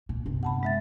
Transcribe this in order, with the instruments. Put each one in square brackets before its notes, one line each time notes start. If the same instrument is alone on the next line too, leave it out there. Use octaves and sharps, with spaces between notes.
[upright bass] A#2
G1 C3
[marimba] F#5 A5 B5
G#3 E5 A6